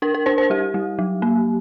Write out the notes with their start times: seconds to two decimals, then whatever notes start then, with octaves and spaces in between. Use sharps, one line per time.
0.02 D4 A#4
0.14 A#4
0.26 D4 C5
0.38 C5
0.50 G3 G4
0.74 G3
0.99 F#3
1.22 A#3